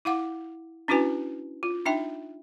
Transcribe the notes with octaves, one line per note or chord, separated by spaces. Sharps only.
E4 F5 F#5 D6
C#4 D4 E4 F#4 B4 G#5
F4
D4 D#4 E5 G5